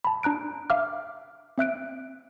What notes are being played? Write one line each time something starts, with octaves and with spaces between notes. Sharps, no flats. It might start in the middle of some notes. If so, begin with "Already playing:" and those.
A5 B5
D4 A#5 F#6 D7
E5 F5 D6 F6
C4 E5 F#6 D7